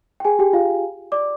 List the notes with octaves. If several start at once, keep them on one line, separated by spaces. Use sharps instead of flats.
G5
G#4 G#5
G4 G5
F4 F5
D5 D6